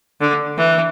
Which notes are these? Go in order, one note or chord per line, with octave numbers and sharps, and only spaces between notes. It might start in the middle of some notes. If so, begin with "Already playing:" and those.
D3
E3